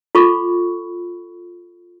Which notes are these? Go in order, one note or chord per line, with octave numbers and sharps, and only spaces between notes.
F4 A4 B5 C#6